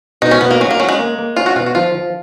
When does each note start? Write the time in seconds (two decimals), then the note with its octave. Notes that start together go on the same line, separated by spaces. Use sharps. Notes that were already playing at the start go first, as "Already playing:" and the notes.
0.22 B2 D#4
0.31 C#4
0.41 B2 B3
0.51 A#3
0.60 F#3 C#4
0.71 A#3
0.80 F#3 C#4
0.89 G#3
0.99 A#3
1.18 A#3
1.36 C#4 F4
1.46 F#4
1.56 B2 F4
1.66 F#4
1.75 F3 F4
1.95 F3